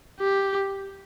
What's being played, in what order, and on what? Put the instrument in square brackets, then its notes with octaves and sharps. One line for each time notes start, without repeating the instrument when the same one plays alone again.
[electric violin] G4